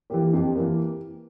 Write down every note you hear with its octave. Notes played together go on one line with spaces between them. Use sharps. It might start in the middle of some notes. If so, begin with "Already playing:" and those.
E3 A#3 G4
F2 G4
E3 A#3